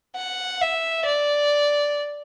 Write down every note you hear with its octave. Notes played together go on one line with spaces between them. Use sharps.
F#5
E5
D5